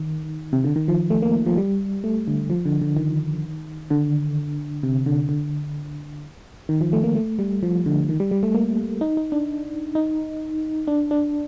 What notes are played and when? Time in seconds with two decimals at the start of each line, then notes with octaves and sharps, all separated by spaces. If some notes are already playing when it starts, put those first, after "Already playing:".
Already playing: D#3
0.53 C3
0.64 D3
0.76 D#3
0.88 F3
1.10 A3
1.22 A#3
1.46 F3
1.58 G3
2.04 A3
2.28 D3
2.50 F3
2.65 D3
2.81 D3
2.97 D#3
3.90 D3
4.83 C3
5.06 D3
5.29 D3
6.69 D#3
6.81 F3
6.93 A3
7.04 A#3
7.15 A3
7.39 G3
7.63 F3
7.86 D3
8.09 D#3
8.20 G3
8.31 G3
8.43 A3
8.55 A#3
9.01 D#4
9.17 D#4
9.32 D4
9.95 D#4
10.87 D4
11.11 D4